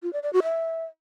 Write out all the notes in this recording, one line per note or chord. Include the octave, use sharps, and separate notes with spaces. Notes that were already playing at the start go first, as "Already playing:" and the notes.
F4
D5
D5
F#4
E5